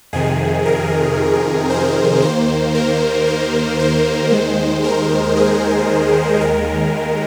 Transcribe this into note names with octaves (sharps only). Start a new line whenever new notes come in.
F2 C3 D#3 G#4
A#4
C5
D#2 D#3 A#3 C5
A#4
A#4
C5
D#2 D#3 G#3
A#4
G#4
D#2 D#3 G#3 A#4